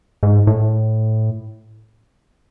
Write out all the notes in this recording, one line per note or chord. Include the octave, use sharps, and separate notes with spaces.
G#2
A2